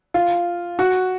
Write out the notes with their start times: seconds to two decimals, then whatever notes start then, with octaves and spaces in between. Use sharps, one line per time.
0.14 F4
0.79 F#4